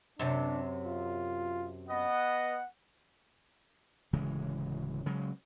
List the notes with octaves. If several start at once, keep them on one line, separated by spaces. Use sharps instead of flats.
F#2 C3 D4
F4
B3 D#5 F#5
D1 C#3 E3 G#3
C#3 F#3 G#3